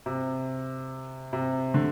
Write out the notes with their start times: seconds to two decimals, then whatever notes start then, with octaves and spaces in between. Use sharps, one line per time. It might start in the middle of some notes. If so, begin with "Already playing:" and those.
0.06 C3
1.33 C3
1.74 D3